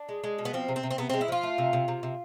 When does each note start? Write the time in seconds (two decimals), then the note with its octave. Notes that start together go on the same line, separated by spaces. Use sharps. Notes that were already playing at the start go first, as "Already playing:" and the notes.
Already playing: D4
0.09 G#3
0.23 G#3
0.39 B2
0.45 B3
0.53 F3 C4
0.68 C3
0.76 C4
0.83 C3
0.91 C4
0.98 C3 B3
1.10 G#3 C4
1.21 E4
1.28 F3 F4
1.43 A3
1.58 C3
1.73 C3
1.88 C3
2.03 C3